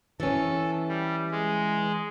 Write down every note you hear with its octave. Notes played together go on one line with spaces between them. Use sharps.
E3 C#4 A4
G3
G#3